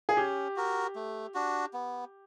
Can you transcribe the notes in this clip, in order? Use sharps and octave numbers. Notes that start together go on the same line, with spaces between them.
G#4
C#4 G4
F#4 A#4
A3
D4 F#4
B3